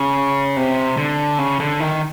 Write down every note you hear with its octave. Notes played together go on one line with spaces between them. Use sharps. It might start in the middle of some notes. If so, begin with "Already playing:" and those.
Already playing: C#3
C3
D3
C#3
D3
D#3